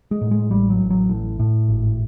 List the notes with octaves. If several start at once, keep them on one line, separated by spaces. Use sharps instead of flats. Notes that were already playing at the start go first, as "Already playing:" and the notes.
G#3
A2
G#3
A1 G3
F#3
A1
F#3
A2
A2
G#1